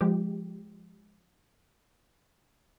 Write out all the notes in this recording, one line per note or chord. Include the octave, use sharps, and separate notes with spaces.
F3 G#3 G4